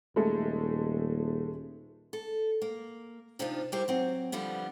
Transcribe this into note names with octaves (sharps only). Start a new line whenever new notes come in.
D#1 G#3 A3
A4
A#3
C3 F3 D4 D#4 F4
G3 A#3 E4 G4 C5
F#3 C4
D3 F3 G3 B3